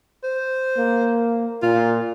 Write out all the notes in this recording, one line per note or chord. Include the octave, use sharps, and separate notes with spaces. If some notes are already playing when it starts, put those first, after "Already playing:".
C5
A#3
A#2 F4